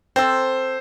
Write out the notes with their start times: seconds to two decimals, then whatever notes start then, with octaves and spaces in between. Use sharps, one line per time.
0.16 C4 A4 C5 E6